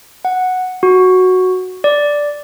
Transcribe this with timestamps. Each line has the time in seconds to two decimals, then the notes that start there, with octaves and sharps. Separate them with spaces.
0.25 F#5
0.83 F#4
1.84 D5